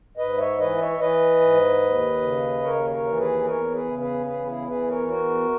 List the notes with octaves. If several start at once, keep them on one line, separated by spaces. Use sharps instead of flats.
G#2 B4 D#5
C#5 E5
E3 B4 D#5
C#5 E5
E3 B4 D#5
G#2
D#2
C#3
D#2 A#4 C#5
A#4 C#5
E3
G#4 B4
E2 A#4 C#5
G#4 B4
C#3
G#4 B4
E2 G#4 B4
E4 G#4
E3 G#4 B4
A#4 C#5
E2 F#4 A#4